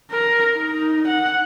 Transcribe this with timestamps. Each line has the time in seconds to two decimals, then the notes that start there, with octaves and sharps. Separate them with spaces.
0.11 A#4
0.56 D#4
1.08 F#5